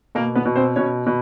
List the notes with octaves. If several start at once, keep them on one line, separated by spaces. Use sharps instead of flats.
B2 A#3 A#4
B3 B4
B2
C4 C5
B2 C#4 C#5
B2